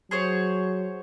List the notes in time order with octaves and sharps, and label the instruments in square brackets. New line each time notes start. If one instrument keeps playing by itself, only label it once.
[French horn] F#3 [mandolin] G#4 C5 C#5